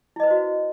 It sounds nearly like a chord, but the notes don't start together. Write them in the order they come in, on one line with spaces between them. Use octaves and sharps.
E4 D#5 B4 C5 F#4